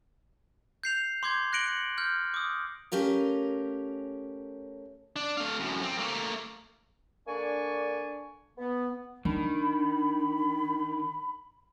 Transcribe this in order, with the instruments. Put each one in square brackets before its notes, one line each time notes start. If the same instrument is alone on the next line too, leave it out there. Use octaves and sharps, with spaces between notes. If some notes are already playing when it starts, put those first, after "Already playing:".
[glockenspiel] G6 C7 F7
C6 D6 G6 G#6
F#6 A#6 C#7 D7 F#7 G7
C#7
F6 G6
D6 D#6
[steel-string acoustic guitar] A3 C#4 G4 A#4 F5
[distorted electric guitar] D4
A3 F5
F#2 A2
F3 C4
A3 A#3
[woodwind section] D3 A#3 D4 D5 G#5 C#6
B3
[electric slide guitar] D#3 [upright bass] D4 [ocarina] B5